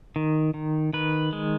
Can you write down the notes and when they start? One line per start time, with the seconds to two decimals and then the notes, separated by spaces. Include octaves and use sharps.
0.16 D#3
0.54 D#3
0.93 D#3 B4
1.33 G#3